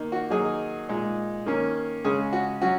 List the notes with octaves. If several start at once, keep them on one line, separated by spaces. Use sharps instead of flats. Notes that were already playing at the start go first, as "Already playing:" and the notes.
Already playing: D#3 A#3 D#4
F#4
D#3 F#3 A#3 D#4 G#4
A#2 G#3 D#4
D#3 A#3 C#4
C#3 G#3 C#4 G#4
F#4
F#3 C#4 F#4